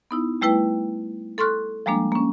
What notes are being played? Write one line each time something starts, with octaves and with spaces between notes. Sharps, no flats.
B3 D#4 E4
G3 A3 E4 B4 G5
A4 C6 C#6 F6 F#6
F3 G3 G#3 A#3 D4
A#3 C#4